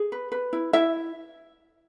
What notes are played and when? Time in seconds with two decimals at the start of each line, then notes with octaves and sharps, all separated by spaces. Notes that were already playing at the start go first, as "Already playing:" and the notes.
Already playing: G#4
0.12 B4
0.32 B4
0.53 E4
0.73 E4 E5